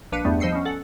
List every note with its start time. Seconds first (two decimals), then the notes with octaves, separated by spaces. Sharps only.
0.12 A#1 D4 B4 F5 C#7 D#7
0.25 E2 G2 G3 A3 B3
0.40 F3 C5 D#5 E6 C7 C#7
0.52 B3 C#4
0.65 A4 F#5